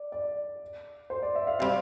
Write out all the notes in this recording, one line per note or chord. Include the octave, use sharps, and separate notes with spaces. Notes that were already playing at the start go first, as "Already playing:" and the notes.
Already playing: D5
D5
C5
D5
E5
F5
C3 G3 C4 F5